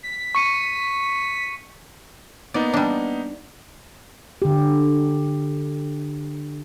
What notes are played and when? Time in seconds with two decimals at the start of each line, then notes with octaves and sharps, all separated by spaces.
0.03 B6
0.35 C#6 C#7 D#7
2.54 A#3 B3 D#4 D5
2.74 G3 D4
4.42 D3 G4